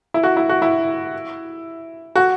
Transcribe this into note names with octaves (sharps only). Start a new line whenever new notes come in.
E4
F#4
E4
F#4
E4
F#4